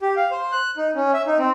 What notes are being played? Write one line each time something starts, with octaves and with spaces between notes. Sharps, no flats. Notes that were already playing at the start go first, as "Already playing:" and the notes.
G4
F5
C5
F#6
D#4
C#4
E5
D#4
C4